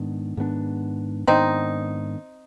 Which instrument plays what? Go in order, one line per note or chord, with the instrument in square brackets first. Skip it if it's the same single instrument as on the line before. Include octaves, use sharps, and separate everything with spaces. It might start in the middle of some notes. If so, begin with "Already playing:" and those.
Already playing: [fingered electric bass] G#2 D#3 B3 D4
G#2 D#3 B3 D4
[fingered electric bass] G#2 D#3 B3 D4 [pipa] C4 D#4